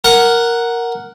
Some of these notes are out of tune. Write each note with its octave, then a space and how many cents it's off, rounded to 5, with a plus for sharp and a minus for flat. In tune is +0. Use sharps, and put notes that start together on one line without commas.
A#4 +0 F#5 +0